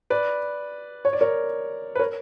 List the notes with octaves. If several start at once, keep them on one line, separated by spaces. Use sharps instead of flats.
B4 D5
C#5
D5
A#4 C#5
B4
A#4 C#5